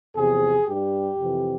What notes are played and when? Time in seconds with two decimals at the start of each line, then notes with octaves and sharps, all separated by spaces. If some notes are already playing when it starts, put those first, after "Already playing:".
0.16 E2 C3 F3 G#4
0.67 G2 G4
0.73 G3
1.20 F2 C3 E3